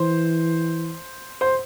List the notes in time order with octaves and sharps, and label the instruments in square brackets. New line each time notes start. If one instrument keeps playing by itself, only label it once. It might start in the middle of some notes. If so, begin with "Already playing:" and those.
Already playing: [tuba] E3 [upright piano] C5
[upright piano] C5